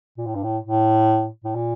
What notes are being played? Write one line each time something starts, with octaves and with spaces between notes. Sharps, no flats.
A#2
A2
G2
A2
A2
A2
A#2